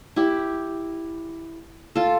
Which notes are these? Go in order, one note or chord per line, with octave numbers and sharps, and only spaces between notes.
E4 G4
F4 A4